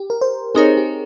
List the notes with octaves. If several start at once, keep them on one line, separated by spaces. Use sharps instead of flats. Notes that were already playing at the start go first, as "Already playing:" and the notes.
Already playing: G4
A#4
C5
C4 D#4 G#4 A#4 C#5
G4